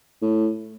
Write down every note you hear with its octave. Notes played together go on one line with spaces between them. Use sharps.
A2